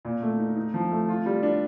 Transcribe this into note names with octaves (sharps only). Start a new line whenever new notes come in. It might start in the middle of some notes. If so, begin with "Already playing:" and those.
A#2
A3
D#4
D#4
F3
A3
F4
G3
D4